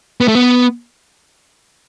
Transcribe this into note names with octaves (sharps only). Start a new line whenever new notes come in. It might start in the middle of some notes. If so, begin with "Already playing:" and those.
B3
A3
B3